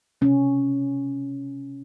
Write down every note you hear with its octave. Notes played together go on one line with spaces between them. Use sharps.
C3 C#4